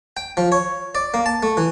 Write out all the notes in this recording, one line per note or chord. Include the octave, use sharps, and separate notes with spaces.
G5
F3
C#5
D5
A#3
A5
A3
E3